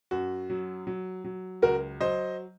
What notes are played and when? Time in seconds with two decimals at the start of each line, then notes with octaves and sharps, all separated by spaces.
0.11 F#2 F#4
0.50 F#3
0.87 F#3
1.24 F#3
1.62 C#2 F#4 A#4
2.01 F#3 C5 D#5